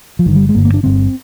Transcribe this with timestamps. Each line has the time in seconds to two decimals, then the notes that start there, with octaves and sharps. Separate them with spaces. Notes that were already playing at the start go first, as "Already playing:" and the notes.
0.19 F3
0.25 G1 G2 D3 D#3
0.36 G3
0.49 G#3
0.54 G1 G2 D3 A#3
0.65 A#3
0.74 D4
0.83 G1 G2 D3 C4